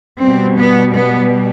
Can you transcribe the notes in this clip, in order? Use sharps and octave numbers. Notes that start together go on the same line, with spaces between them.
B2 G3 C4
B3
B3